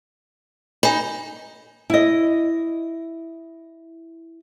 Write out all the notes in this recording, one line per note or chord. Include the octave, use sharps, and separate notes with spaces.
D#4 G#5 B5
E4 D#5